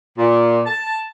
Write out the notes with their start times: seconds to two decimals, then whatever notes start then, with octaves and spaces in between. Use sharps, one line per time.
0.18 A#2
0.66 A5